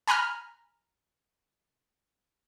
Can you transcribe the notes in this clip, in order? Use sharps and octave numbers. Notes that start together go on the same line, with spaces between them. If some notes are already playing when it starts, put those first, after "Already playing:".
G#5 A#5 B5 F6